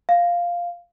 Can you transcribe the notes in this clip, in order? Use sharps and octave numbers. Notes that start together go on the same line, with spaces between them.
F5